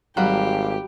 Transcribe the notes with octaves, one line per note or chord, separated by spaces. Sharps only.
G#1 F#3 G3 G4 F5